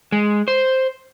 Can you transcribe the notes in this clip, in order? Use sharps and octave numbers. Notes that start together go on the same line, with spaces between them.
G#3
C5